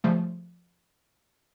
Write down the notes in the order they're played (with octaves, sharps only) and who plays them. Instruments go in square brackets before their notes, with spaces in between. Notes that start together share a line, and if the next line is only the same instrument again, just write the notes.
[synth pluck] C#3 F3 G3 A3